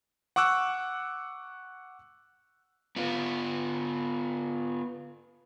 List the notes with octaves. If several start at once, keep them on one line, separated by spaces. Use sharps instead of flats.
F#5 C#6 D6 E6 F#6
B3 F4